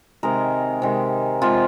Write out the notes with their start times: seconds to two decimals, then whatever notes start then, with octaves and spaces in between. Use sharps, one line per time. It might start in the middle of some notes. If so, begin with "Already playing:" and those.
0.23 C3 D#3 G#3 A#4
0.82 C3 D#3 G#3
1.42 C3 F3 G#3 F4